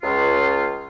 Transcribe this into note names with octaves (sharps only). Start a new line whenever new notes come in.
C#2 F4